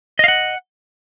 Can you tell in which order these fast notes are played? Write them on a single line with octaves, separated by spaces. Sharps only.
D#5 F5 F#5